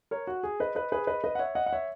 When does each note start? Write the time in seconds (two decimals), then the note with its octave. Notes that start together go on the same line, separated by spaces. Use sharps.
0.11 A#4 C#5
0.27 F#4
0.43 G#4
0.60 B4 D#5
0.75 B4 D#5
0.92 G#4 B4
1.07 B4 D#5
1.24 B4 D#5
1.35 F#5
1.39 C#5 E5
1.55 D#5 F#5
1.66 F#5
1.73 C#5 E5